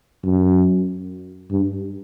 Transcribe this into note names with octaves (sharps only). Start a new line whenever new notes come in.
F#2
G2